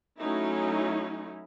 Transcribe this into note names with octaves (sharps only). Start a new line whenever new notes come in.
F#3 A3 C#4 D#4 E4